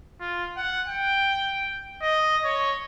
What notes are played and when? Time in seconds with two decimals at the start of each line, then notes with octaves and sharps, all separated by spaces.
0.21 F4
0.57 F#5
0.88 G5
2.02 D#5
2.44 C#5